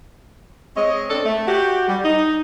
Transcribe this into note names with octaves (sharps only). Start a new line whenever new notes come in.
G#3 C4 C#5 D#5
C4 D4 A4
A3
F#4 G4
G3
D#4